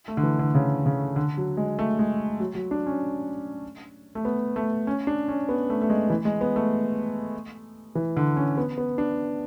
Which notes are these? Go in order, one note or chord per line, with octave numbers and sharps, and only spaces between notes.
A3
D3
E3
D3
C#3
C#3
D3
F#3
G#3
A3
G#3
F#3
F#3
D4
C#4
A3
B3
A3
C#4
D4
C#4
B3
A3
A3
G#3
E3
G#3
B3
A3
E3
D3
C#4
B3
B3
D4